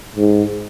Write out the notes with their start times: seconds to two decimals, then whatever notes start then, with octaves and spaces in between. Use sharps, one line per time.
0.16 G#2